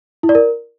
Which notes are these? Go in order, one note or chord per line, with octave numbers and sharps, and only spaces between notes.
E4
D5
A#4